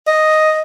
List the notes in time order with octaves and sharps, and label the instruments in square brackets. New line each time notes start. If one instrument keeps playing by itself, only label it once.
[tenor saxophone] D#5